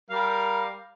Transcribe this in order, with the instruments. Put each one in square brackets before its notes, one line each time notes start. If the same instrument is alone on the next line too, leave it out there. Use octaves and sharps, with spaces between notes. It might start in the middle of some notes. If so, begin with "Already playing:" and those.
[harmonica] G3 A#4 F5